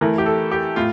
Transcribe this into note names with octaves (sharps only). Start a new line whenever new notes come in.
E3 A3 E4 A#4
G4
A4
G4
A2 F4